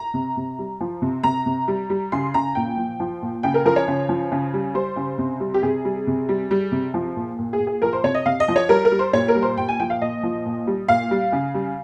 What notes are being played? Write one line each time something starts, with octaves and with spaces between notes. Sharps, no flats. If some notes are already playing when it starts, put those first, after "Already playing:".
Already playing: A#5
C3
C3
G3
F3
C3
C3 A#5
C3
G3
G3
C#3 C6
C#3 A#5
A#2 G5
F3
F3
A#2
C#3 G5
A#4
F3 A#4
C#5
C#3
F3
C#3
G3
G3 C5
C#3
C3
G3
G4
C3 G#4
G3
C3
G3
G3
C3
F3
A#2
A#2
G#4
A#2
G#4
F3 A#4
C5
C3 C#5
D#5
C3 F5
D#5
F3
C#5
G3 A#4
A#4
G3
C5
A#2 C#5
A#4
G3
C5
A#2 G5
G#5
F3 G5
F5
A#2 D#5
F3
A#2
G3
A#2 F5
G3
C#3
G3